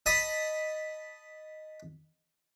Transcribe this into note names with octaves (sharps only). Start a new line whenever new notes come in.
D#5 A5 B5 D#6